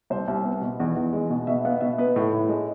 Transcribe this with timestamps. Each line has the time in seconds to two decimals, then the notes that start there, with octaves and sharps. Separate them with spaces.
0.10 C2 C5
0.28 C2
0.45 B3
0.61 B2
0.80 E2
0.96 E2
1.13 G#3
1.30 B2
1.47 B2 E5
1.65 B3 F5
1.81 B2 E5
1.98 B3 B4
2.16 A2
2.33 A2
2.49 G#3